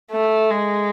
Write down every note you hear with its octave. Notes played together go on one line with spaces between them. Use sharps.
A3
G#3